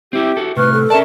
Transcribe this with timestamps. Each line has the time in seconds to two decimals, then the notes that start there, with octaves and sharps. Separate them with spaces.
0.13 C4 E4 G4 E5
0.37 F#4 A4
0.57 A2 C3 B4 C#6 F6 F#6
0.73 A4
0.90 C#4 A#4 D5 E5 A5